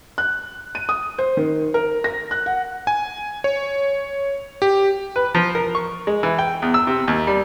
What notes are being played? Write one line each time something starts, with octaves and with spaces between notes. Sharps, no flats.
F#6
D#7
D#6
C5
D#3
A#4
A#6
F#6
F#5
G#5
C#5
G4
B4
F3
A#4
C#6
G#3
E3
G5
E2
E6
C3
D#2
G3